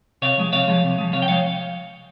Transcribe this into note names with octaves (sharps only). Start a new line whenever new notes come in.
C3 C#5 F5
F3 G#3
C3 C#5 F5
F3 G#3
C3
F3 G#3
C3 C#5 F5
G5
F3 G#3 C#5 F5